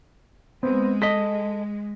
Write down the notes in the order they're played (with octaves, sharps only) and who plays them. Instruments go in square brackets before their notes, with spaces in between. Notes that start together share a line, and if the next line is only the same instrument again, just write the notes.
[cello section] G#3 [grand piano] B3 C4
[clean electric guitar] A4 D#5 [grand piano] A#6 B6